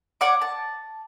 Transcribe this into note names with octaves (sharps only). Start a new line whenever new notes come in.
C#5 D5 F#5 D6
A5